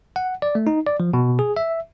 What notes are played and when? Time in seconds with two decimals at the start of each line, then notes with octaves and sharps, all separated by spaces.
0.16 F#5
0.42 D5
0.55 A3
0.67 D#4
0.87 D5
1.00 F3
1.14 B2
1.39 G#4
1.56 E5